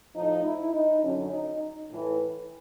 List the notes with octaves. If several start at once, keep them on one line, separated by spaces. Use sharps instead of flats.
A2 F3 D#4
E4
D#4
F#2 D3 F#3 C#4
D#4
A2 E3